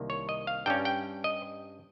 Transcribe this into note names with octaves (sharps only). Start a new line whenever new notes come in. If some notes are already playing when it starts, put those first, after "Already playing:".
Already playing: C2 C3 D#3 A#3
C#5
D#5
F5
G2 G3 C#4 G5
G5
D#5